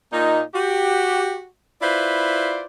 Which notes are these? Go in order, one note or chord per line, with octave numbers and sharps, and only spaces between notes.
A#2 D#4
F#4 G4
E4 F4 B4 C5 D5